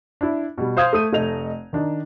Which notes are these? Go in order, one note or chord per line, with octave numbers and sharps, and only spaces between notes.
D4 E4
B2 G3
C5 F5 D#6 G6 G#6
A3 D#6 D#7
F1 A3 D#5 F7
D#3 D4 D#4